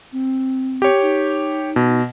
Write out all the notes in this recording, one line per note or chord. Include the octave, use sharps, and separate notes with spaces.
C4
G4 C#5
D#4
B2